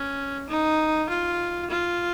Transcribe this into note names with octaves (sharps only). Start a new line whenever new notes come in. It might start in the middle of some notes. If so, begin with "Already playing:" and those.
Already playing: C#4
D#4
F4
F4